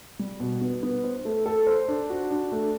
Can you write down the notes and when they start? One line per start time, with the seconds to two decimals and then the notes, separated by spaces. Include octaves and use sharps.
0.19 G3
0.40 B2
0.61 B3
0.83 B3
1.04 C5
1.25 A3
1.46 A4
1.67 C5
1.88 D4
2.10 F#4
2.30 D4
2.52 A3